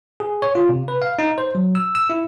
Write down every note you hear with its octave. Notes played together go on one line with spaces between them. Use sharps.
G#4
C#5
F4
C3
B4
F5
D#4
C5
F#3
E6
E6
E4